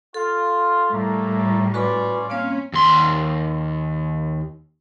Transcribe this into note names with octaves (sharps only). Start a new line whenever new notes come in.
F4 A4
A2 G3 A3 A#3 A#5
C#4 F4 F#4 B4 D5 B5
A#3 C4 C#4 C#5 F5
D#2 C6